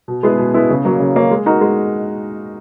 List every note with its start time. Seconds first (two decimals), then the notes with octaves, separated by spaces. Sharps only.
0.08 B2
0.23 G#3 B3 E4 G#4
0.39 B2
0.54 G#3 B3 E4 G#4
0.70 C#3
0.85 F#3 A#3 C#4
1.00 C#3
1.15 F#3 A#3 C#4
1.31 G#3
1.46 D#4 F#4 A#4
1.61 G#3